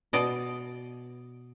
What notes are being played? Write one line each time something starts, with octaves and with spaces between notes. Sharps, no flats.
B2 D5 D#5